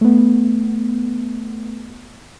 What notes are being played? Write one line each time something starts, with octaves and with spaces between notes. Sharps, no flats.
A3 B3